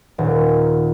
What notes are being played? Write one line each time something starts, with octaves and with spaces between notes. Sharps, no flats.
D#1